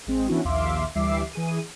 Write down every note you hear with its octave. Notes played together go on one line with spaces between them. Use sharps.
A1 G#3 C4
E3 B3 C#4 D4 E4 F#4
A#1 D#2 E5 F5 C6 D6
D2 E3 G3 E5 D6 C7
E3 G#4 D#7